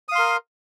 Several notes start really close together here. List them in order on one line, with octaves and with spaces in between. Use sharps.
D#6 F5 C6 A#4